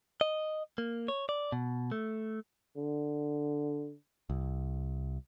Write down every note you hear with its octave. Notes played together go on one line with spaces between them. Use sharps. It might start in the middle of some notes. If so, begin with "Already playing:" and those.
D#5
A#3
C#5
D5
B2
A3
D3
C2